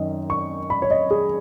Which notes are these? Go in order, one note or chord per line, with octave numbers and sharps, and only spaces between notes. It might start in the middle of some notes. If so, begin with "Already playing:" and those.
Already playing: F#2 D#3 D#5
C#6
B5
C#5
D#5
G#4